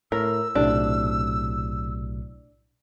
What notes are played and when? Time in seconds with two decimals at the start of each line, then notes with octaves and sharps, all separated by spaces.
0.12 A2 A#4 E6
0.55 B1 A2 C3 D4